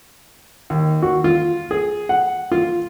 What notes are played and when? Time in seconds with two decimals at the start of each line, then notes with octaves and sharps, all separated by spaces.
0.70 D#2
1.03 F#4
1.24 F4
1.71 G#4
2.09 F#5
2.52 F4